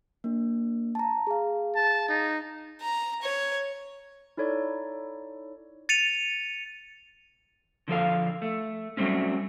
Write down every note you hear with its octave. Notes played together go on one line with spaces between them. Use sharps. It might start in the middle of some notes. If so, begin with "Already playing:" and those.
A#3 D4
A5 A#5
G#4 F5
A5
D#4
A#5
C#5
D#4 E4 A4 C#5 D5
A6 C#7 D#7 F7
D3 F3 A4 F5
A3
F#3 G3 A3 C4 C#4